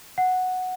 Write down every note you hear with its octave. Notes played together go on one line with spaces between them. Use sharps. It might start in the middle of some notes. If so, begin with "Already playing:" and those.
F#5